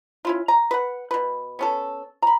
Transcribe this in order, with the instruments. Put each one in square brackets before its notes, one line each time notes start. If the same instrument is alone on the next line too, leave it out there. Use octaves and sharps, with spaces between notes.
[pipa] C#4 E4 F4
A#5
B4 F#5
B2 B4
B3 C#4 A4
A#5 B5